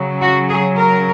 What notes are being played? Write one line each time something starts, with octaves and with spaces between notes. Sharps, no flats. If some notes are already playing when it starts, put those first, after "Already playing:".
Already playing: C#3 F#3
F#4
G#4
A#4